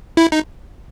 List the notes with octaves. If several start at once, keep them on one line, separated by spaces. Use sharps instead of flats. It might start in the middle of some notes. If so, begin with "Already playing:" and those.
E4
D#4